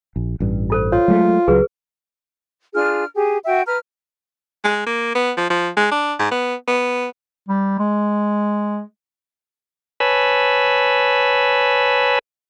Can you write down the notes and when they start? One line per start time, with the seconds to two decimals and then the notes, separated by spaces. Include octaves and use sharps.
0.16 A#1
0.40 A1 G2
0.70 F4 A4 C5
0.92 F4 C#5
1.08 F#3 G#3 A3
1.48 C#2 F#3 G#4 B4 E6
2.74 D4 F4 G#4 F6
3.14 G4 G#4
3.45 F#4 E5 G5
3.66 B4 A#5 F6
4.64 G#3
4.87 A#3
5.15 B3
5.37 F3
5.50 F3
5.77 G#3
5.92 D4
6.19 G#2
6.31 B3
6.68 B3
7.49 G3
7.79 G#3
10.00 B4 C#5 G#5 A5 B5 E6